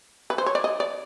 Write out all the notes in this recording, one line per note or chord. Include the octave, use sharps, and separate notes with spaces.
B4
C5
C#5
D5
D#5
D5